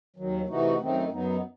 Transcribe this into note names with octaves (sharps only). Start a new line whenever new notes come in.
D#2 D#3 F#3
C3 E3 A3 D#4 F#4
F#2 D#3 A3 C4 D#4
F#2 F#3 B3 D#4